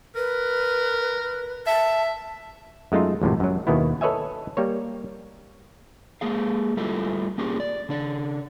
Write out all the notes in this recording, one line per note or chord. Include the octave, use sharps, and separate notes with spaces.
A#4 B4
E5 A5
F#2 G#3 A3 D#4 F4
G#1 F2 A2 C3
F#2 F#3
D#2 B2 D#3 B3 E4
A4 B4 C#5 D#5 E5 G#5
G3 A#3 C#5
G#3 A#3 G#4 F5
G3 A3 E4 F4 G4 A4
A#3 C#4 G4 G#4 A#4
D5
C#3 D4 D5